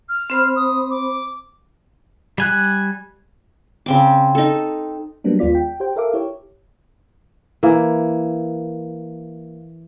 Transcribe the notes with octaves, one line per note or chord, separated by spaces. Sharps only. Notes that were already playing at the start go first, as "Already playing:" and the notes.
F6
C4 C5 B5
D#6
D6
G3 G#5 F#6
C#3 C4 D6
D#4 A4
F#3 G3 A#3 B3 D4
D#2 G#3 B3 F4 D5 B6
G5
G4 C5 G5
A4 A#4 E5 F5 D6
E4 G4 C#5
E3 A#3